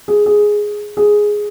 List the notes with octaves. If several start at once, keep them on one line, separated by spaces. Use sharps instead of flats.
G#4
G#4
G#4